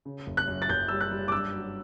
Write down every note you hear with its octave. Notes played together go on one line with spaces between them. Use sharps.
C#3
F#1
F#6
F#2
A6
F#1 G6
G3 E6
F#6
G3
D6
G2 E6
F#3